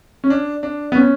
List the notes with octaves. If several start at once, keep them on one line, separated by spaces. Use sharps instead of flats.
C#4
D4
D4
B3
C#4